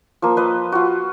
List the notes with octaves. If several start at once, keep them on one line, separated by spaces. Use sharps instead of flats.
F3 A#3
B4 D#5
F4 F#4